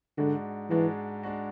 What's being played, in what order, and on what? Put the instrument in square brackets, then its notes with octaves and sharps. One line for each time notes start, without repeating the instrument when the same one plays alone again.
[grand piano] G#2 G#3 D4 F#4 [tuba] D3
[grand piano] G#2 G#3 D4 F#4 [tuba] E3
[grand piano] G#3 D4 F#4